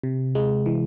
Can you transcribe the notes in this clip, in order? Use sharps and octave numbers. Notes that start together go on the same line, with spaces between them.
C3
G#3
E3